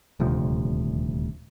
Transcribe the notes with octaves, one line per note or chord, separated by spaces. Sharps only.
D#1 D2 C3 F3